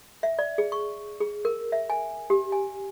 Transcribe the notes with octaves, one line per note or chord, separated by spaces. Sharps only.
E5
D5
G#4
C#6
G#4
A#4
E5
G#5
G4
G#5